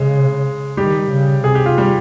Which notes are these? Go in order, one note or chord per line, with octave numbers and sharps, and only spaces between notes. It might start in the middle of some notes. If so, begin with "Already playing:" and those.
Already playing: C#3 G#3
D#3 G3 G4
C#3
C3 G#4
G4
F4
G3 G4